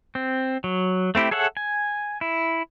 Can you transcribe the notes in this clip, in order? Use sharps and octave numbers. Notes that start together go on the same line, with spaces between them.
C4
F#3
A3 C4 E4 G4
G#4 A4 C#5 E5 F#5
G#5
E4